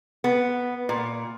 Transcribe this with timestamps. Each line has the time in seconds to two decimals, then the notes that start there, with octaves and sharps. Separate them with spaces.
0.24 B3
0.89 A#2